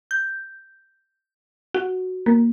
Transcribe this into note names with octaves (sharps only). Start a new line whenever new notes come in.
G6
F#4
A#3